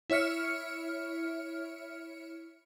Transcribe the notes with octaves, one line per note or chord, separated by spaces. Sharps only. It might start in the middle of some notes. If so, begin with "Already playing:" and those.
E4 C#5 E5 F6 C#7